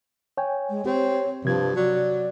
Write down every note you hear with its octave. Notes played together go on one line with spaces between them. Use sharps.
C#5 G5 G#5
G#3
C4 G4 C#5
G2 C3 F3 G#6
F#3 D5